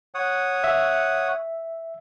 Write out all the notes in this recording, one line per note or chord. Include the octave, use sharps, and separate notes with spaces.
C#5 F#5 D#6
E5